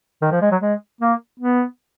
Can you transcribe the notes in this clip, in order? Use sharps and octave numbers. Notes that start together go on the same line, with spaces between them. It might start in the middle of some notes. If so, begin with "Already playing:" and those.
D#3
F3
G#3
F#3
G#3
A#3
B3